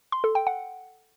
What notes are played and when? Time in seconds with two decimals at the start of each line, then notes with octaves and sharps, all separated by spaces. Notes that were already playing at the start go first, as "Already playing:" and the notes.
0.12 C6
0.24 A4
0.35 G5
0.47 F#5